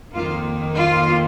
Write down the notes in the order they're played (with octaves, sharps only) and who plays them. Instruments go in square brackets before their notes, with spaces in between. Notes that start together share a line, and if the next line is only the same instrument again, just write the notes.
[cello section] F2 D#3 A#3 F4
F4